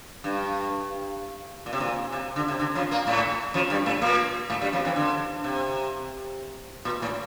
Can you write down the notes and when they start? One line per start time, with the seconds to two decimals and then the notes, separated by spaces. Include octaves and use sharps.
0.24 G2
1.66 A#2
1.73 C3
1.80 A#2
2.12 C3
2.36 D3
2.48 C3
2.60 D3
2.75 F2 F3
2.91 A#2 A#3
3.07 A2 A3
3.54 F2 F3
3.70 G2 G3
3.86 A2 A3
4.01 A#2 A#3
4.50 A2 A3
4.61 G2 G3
4.73 F2 F3
4.85 E2 E3
4.96 D3
5.44 C3
6.85 A#2
7.02 A2